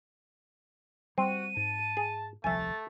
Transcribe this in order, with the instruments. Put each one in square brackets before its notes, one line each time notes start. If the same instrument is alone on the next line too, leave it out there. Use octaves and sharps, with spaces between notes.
[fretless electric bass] G3 [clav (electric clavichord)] C4 [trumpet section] F#4 [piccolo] D#7
[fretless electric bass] G#2 [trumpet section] A5
[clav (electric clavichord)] G#4
[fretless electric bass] D#1 C2 F3 [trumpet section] A3 [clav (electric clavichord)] E5 G#5 [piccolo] A6